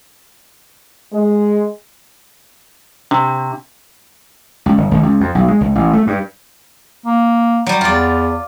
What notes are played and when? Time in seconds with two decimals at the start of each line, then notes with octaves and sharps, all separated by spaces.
1.13 G#3
3.11 C3 D4
4.66 C#2
4.78 G1
4.91 G#1
5.03 C#2
5.21 F2
5.35 B1
5.48 G#3
5.61 C#2
5.75 A1
5.93 A3
6.07 G2
7.06 A#3
7.66 F#3 G3
7.81 E2 F4 D5